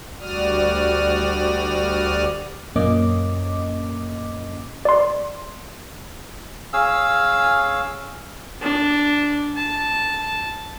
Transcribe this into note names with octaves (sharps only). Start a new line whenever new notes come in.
D2 G3 F#4 D5 D#6 F6
F#2 A#2 A#3 C#4 D#5 D6
D5 C6
C#4 G#4 F5 E6
D4
A5